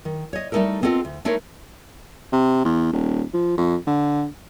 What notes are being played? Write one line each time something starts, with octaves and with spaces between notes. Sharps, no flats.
D#3
C#5 D#5
G3 A3 C#4 D#4 A4 A#4
B3 C4 F4 A4 D#5
D2
A3 D#4 E4 A#4 C5 C#5
C3
E2
D#1
F3
F2
D3